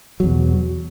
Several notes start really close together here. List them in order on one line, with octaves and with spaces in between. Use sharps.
F#3 E2 B2